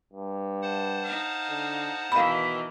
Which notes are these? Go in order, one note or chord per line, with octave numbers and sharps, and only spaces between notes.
G2
C5 F#5 A5
D#4 F5
D3
B2 D#3 E3 F5 B5